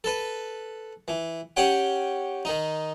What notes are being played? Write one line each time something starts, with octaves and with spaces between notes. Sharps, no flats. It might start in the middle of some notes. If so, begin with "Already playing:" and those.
A4 B4
E3
C#4 G4 C#5 F#5 G5
D#3 D#4